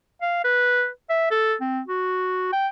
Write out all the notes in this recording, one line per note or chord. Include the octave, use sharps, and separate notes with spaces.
F5
B4
E5
A4
C4
F#4
G5